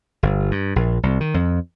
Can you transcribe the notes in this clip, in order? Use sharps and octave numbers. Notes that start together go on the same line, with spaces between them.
G1
G2
A#1
C2
D#3
F2